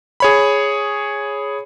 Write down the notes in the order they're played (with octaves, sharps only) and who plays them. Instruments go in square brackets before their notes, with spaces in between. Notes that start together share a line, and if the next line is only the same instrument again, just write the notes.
[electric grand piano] G#4 C#5 B5